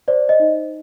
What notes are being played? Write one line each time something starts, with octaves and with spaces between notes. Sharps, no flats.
C5 D5
D#5
D#4